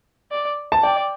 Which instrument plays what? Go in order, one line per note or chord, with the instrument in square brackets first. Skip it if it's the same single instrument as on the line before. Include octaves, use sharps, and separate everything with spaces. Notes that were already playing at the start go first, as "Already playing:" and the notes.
[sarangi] D5
[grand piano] A5
[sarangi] D5 [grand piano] G5